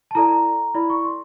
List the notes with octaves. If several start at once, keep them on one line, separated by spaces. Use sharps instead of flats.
A5
E4 A4 D5 A#5
E4 A4 D5 B5
C#6
C6